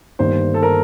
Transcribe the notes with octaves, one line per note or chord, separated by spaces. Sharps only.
G1 G2 D#3 A#3 C5
A4
A#4